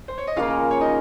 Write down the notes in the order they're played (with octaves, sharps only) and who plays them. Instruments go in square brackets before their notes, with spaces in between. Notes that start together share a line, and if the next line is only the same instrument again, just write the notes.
[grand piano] C5
C#5
D#5
[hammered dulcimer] C#3 F3 A#3 [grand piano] F4 F5
[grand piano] C#5
D#4 D#5